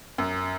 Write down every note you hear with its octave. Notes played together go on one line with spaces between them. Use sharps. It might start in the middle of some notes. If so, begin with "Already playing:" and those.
F#2